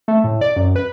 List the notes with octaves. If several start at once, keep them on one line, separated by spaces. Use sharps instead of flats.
A3
A2
D5
F#2
B4